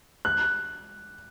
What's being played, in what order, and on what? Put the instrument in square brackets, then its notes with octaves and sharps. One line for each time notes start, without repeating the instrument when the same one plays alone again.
[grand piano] F#6